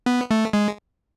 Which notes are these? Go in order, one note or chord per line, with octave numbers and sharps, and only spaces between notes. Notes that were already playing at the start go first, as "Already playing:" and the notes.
B3
A3
G#3